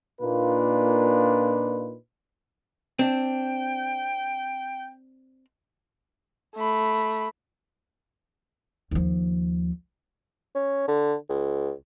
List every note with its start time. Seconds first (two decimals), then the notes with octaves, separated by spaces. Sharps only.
0.21 A#2 A#3 D4 D#4 F4 B4
2.99 C4 D4 G5
6.55 A3 B5
8.91 D#2 F3
10.55 C#4
10.88 D3
11.29 C#2